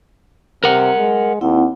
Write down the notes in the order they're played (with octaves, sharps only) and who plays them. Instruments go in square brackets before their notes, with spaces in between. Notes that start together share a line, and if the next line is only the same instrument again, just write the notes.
[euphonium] C3 [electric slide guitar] A#4 F#5
[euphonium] G#3
[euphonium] D#2 [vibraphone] C4 E4 F#5